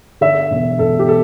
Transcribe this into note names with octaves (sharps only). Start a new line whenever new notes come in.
D3 E5
E1
E1 A4
G4
A4